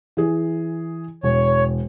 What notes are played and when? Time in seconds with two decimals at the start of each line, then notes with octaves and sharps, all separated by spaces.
0.17 E3 G#4
1.23 E1 C#5